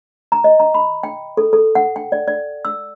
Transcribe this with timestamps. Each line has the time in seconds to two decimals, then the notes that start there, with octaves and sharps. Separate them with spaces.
0.32 A#5
0.44 D#5
0.60 A#5
0.74 B5
1.03 G5
1.37 A4
1.53 A4
1.75 F#5
1.96 G5
2.12 D5
2.28 D5
2.65 E6